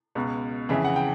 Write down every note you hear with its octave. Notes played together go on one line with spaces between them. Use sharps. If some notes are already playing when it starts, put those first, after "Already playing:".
C#2 B2
F2 C#3 E3 E5
F#5
G5